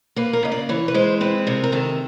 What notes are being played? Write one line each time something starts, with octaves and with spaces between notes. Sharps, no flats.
A#3 B4
A#4
C#3 D#5
D5
E3 C#5
B4
G#3 C5
C4 B4
C3 A#4
A#4
D#3 A4